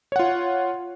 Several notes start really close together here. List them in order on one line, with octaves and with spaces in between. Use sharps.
C#5 F#5 F4